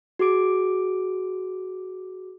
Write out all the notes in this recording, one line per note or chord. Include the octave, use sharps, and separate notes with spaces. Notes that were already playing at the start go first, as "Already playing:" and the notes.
F#4 G#4 D6 D7